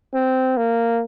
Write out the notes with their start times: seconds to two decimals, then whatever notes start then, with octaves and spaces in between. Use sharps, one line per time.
0.14 C4
0.57 A#3